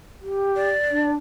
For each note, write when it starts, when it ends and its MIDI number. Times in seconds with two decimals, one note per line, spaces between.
0.21 0.70 67
0.56 1.10 74
0.91 1.14 62